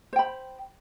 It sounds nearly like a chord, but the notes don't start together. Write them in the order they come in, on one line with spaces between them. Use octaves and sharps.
C5 G5 B5